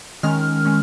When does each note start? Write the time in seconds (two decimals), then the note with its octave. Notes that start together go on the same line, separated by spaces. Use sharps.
0.23 D#3 G#3 C#4 F6
0.65 G#3 C#4